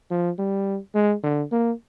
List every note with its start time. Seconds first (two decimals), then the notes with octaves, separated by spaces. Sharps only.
0.11 F3
0.39 G3
0.95 G#3
1.23 D3
1.52 A#3